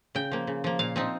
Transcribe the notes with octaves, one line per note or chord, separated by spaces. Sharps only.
C#3 G5
F3 A#3
C#3
F3 A#3
A#2 F5
F3 C4 D#4